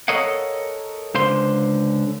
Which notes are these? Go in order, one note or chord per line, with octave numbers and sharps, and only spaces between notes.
A4 A#4 C#5 D#5 F5 F#5
C#2 D3 C5 F5 C6